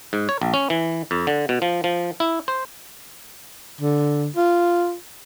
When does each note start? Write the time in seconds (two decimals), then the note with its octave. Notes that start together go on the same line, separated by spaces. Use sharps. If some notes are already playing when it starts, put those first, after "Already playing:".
0.13 G#2
0.29 C#5
0.42 A#1
0.54 C#4
0.70 E3
1.11 F2
1.27 D3
1.49 B2
1.62 F3
1.84 F3
2.20 E4
2.48 C5
3.81 D3
4.36 F4